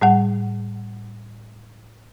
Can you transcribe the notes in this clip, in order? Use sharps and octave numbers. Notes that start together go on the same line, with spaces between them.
A2 G3 F#5